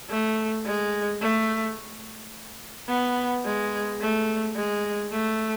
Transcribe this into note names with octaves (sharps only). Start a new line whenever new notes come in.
A3
G#3
A3
B3
G#3
A3
G#3
A3